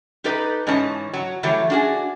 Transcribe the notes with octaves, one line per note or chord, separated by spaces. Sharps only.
D#4 G4 A4 B4 D#5
G#2 E3 C#4 D#5 A5
F#3
E3 F#3 G3 A3
D4 F#4 G#4